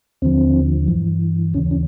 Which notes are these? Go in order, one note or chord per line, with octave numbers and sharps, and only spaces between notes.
D#2 D3 F3 C4
G2 E3
D#2 C#3 E3 C#4
C#4